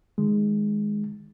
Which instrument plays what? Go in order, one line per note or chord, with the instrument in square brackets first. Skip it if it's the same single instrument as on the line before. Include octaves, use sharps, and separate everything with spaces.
[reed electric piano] D#3 G#3